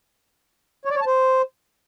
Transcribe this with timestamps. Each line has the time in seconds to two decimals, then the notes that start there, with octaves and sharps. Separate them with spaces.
0.85 C#5
0.91 D5
0.96 C#5
1.01 A5
1.06 C5